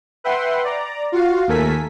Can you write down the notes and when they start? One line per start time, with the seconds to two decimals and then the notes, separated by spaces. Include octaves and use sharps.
0.24 B4 E5 F#5 G5 C6
0.64 D5 A#5
1.12 F4 F#4 F5
1.48 D#2 A3 A4 A#4 G#5 B6